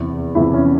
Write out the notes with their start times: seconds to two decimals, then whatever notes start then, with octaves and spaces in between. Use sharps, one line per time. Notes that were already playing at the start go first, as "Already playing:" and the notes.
Already playing: E2 C3 E3
0.35 E2 C3 E3 E4
0.54 C#4